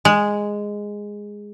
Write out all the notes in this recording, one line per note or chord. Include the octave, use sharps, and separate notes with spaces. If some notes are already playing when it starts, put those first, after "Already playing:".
G#3